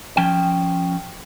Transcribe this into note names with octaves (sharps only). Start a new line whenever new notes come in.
F3 C#4 G5